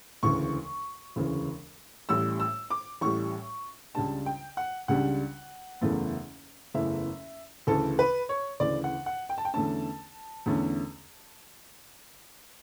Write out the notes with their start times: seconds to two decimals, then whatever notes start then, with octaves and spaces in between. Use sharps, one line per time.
0.23 E1 D2 C#3 E3 C#6
1.16 E1 D2 C#3 E3
2.09 A1 A2 G3 E6
2.40 E6
2.70 D6
3.01 A1 A2 G3 C#6
3.94 C#2 C#3 G3 D4 A5
4.26 G5
4.57 F#5
4.88 C#2 C#3 G3 D4 F#5
5.81 F#1 E2 C#3 E3 A3
6.74 F#1 E2 C#3 E3 A3 E5
7.67 D2 C#3 E3 A4
7.99 B4
8.29 C#5
8.60 D2 C#3 E3 D5
8.84 F#5
9.06 F#5
9.29 G5
9.38 A5
9.45 G5
9.54 E2 D3 A3 C#4 A5
10.46 E2 D3 A3 C#4